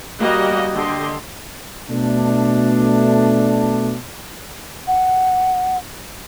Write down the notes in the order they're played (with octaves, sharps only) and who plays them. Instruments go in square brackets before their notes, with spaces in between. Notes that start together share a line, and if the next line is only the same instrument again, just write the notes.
[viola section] G3 A#3 F#4 D#5
D3 G4 D#5 C6
[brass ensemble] B2 A3 D4
[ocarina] F#5